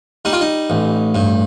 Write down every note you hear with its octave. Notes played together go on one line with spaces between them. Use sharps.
G3 D#4
F4
D#4
A1
G2